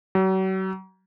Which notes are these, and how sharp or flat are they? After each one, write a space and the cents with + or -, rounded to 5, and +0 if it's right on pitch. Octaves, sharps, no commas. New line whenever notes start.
F#3 +40